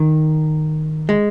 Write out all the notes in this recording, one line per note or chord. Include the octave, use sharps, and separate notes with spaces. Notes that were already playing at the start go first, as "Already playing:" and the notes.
Already playing: D#3
G#3